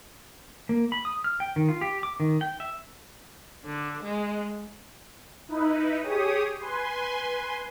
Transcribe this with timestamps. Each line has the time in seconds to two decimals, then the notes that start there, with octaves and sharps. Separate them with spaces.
0.69 A#3
0.92 B5
1.05 D#6
1.24 F6
1.40 G5
1.56 D#3
1.69 F4
1.81 G4
2.03 D6
2.20 D#3
2.41 G5
2.60 E5
3.65 D3
4.02 G#3
5.49 D#4 E4 B4
6.02 G4 G#4 C#5 D#6
6.58 B4 G#5 C6